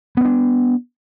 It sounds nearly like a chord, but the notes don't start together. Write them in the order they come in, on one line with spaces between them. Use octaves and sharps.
B3 C4 D4